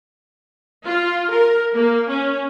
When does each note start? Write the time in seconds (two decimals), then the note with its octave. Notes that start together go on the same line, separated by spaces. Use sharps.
0.86 F4
1.31 A#4
1.75 A#3
2.09 C#4